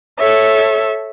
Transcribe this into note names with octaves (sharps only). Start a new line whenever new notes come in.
A4 C#5 E5